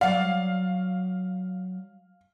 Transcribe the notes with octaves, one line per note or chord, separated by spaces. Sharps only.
F#3 D5 F5